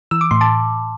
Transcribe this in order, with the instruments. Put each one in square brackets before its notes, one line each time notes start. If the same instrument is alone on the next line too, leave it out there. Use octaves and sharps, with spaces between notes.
[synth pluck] E3 E6
D6
A2 C6
A5 D6